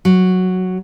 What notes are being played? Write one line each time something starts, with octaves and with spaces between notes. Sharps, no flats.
F#3